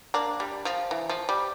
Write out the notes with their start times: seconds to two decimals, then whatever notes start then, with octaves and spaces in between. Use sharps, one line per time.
0.14 A#3 D4
0.40 G3
0.65 F3
0.91 E3
1.09 F3
1.29 G3